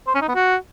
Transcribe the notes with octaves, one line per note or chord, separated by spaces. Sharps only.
C5
C#4
D#4
B3
F#4